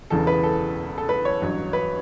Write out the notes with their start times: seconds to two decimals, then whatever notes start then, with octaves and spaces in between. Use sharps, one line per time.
0.10 E1 E2 C#3 E3 A4
0.27 B4
0.43 A4
0.98 A4
1.09 B4
1.25 C#5
1.41 A1 G2 F#3
1.73 B4